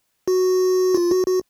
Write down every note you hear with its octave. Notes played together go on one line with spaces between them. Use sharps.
F#4
F4
F#4
F#4